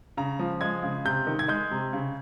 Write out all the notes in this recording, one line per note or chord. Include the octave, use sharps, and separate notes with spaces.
C#3 A#5
F3
G#3 G#6
C#3
C3 G6
D#3
G#6
G#3 G6
C3
C#3